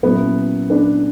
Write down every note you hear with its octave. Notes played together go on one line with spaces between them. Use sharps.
A#2 F#3 A#3 B3 C#4 E4
B3 D4